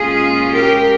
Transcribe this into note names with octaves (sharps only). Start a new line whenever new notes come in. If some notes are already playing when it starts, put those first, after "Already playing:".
Already playing: A#2 G#3 C#4 F4 G#4
G4 A#4